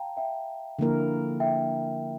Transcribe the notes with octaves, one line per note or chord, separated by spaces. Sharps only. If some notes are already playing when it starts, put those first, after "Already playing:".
Already playing: F5 G5 A5 A#5
E5 G5
D3 F3 A#3 E4 A#4
E5 G5